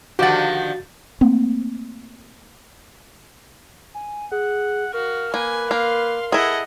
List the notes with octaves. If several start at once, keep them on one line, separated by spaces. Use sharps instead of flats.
D3 D#3 F3 F#4 G4 F#5 A6
A3 A#3 C4
G#5
G#4 F#5
F#4 A#4 F5
A#3 A#4 B4 G#5
A#3 F5 C6
E4 G#4 A4 D#5 F#5